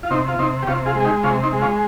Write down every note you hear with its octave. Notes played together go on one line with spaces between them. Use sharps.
F4
C3 C4 D#4
F4
C3 C4 D#4
G4
C3 C#4 F4
F4 G#4
G#3
G#4
D#4 G4
C3 C#4 F4
C4 D#4
G#3
C#4 F4